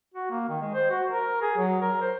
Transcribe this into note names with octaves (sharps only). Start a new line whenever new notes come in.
F#4
A#3
D#3
G#3
C5
F#4
A#4
G#4
F#3
A#4
C5